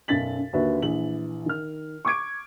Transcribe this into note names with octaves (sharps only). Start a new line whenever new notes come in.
B1 F#2 B2 A6 B6 F#7
D#2 D3 F#4 B4 E5
A#1 E3 F#7
D#3 F6
C#6 D6 G#6 D7